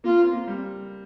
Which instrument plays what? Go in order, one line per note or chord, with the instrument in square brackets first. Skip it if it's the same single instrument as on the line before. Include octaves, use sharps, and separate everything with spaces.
[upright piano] A#3 [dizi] F4
[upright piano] C4
A#3
G3